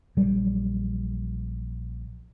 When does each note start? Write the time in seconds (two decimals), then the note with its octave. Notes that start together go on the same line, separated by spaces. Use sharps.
0.17 A#1 F#3 G3